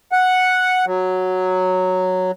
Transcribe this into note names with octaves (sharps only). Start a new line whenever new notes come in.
F#5
F#3